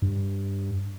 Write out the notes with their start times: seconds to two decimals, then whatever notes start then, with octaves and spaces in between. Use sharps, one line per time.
0.02 G2